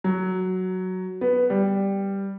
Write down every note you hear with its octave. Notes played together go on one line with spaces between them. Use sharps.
F#3
B3
G3